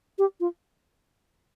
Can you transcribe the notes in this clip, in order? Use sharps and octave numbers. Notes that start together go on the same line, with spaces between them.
G4
F4